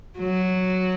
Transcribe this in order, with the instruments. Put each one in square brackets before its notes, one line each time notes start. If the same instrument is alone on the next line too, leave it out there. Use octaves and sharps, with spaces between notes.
[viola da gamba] F#3